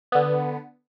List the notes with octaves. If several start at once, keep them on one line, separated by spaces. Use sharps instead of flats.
D3 B3